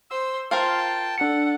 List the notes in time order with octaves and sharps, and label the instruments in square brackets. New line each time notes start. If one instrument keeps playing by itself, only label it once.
[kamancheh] C5 [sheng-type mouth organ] E6
[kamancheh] F4 [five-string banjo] A#4 C5 F5 [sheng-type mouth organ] G5 A5
[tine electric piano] D4 C#7 [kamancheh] A4 F#5